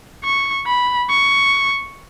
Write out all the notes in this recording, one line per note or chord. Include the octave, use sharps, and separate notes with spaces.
C#6
B5
C#6